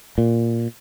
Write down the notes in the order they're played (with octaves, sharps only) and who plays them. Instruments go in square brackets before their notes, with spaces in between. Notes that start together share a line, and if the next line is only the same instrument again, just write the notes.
[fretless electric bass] A#2